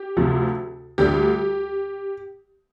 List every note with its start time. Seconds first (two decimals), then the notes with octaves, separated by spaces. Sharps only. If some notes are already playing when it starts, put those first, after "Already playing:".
Already playing: G4
0.17 D2 C3 F3
0.98 D2 D3 G3 G4